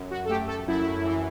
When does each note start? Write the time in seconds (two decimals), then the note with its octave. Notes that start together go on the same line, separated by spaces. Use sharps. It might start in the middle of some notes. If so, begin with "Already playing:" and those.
Already playing: F#2
0.11 F#4
0.25 A4
0.29 A3 G4
0.48 A4
0.67 F#2 E4
1.05 E3